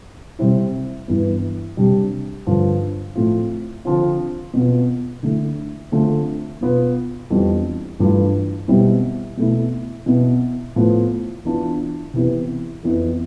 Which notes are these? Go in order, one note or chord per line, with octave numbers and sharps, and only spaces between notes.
C3 G3 C4 E4
G2 E3 B3
C3 G3 D4
G2 D3 F3
A2 F3 A3 C4 F4
D3 F3 C4 F4
B2 B3 F4
D3 A3 E4
D3 A3 C4 F4
B2 B3 F4
F2 E3 G3 B3 D4
G2 E3 A3 D4 F4
B2 G3 C4 E4
B2 A3 E4
B2 B3 E4
A2 F3 B3 F4
E3 B3 D4 F4
C3 E3 B3
F2 E3 B3 E4